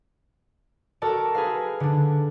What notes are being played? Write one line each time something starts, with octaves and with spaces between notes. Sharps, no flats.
F#4 A4 A#4 D5 A5
G#4 B4 F5
D3 D4